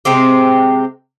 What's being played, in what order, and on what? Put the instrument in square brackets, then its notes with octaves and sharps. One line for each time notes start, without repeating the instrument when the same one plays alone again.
[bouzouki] C3 G#3 C4 G4